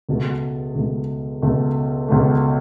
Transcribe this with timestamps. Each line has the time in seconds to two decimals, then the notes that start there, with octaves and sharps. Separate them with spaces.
0.09 C#2 B2 A3
0.75 C#2 B2 A3
1.42 C#2 B2 A3
2.08 C#2 B2 A3